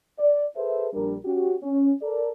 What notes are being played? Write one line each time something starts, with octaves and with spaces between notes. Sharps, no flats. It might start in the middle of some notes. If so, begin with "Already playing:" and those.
D5
G#4 A4 B4 C5 E5
A#1 G3 D4 A#4
C#4 F#4 G4
C#4
A4 A#4 D5